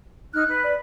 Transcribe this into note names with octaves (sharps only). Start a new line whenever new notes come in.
D#4 F6 F#6
B4
D5